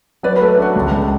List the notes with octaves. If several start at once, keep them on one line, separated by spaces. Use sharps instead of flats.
F#3 B4 D5
B4
A3
D4 F#4
C#2
C#2